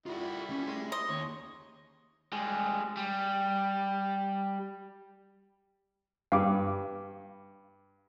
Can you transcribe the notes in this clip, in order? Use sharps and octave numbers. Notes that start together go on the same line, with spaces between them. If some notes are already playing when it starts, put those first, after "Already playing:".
G3 E4 F4 F#5
C#4
G#4 C6
D#5 C6
D#2 C#5
G3 G#3
G3
G2 F5 D6